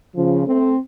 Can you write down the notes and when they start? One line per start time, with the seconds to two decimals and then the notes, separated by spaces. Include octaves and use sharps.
0.15 C#3 F3
0.46 A3 C4